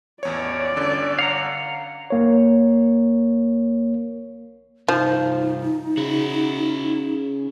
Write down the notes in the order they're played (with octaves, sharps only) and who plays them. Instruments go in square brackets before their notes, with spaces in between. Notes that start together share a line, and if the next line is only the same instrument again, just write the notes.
[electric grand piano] A1 E2 C#5 [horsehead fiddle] D5
[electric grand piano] G1 D3 C#4
[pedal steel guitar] F5 F#5 A#5
[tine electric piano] B1 A#3 C#5
[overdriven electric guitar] C2 G2 [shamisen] F3 [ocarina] D#4
[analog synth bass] C#3 [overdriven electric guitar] E4 F#4